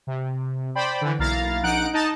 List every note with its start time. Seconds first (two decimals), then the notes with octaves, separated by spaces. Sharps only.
0.07 C3
0.75 C5 D5 G5 B5
1.01 D3 E3
1.19 B1 A#3 E4 F5 A#5 A6
1.63 A#1 D#4 F#5 F#6 D7
1.93 D#4 D#5 A5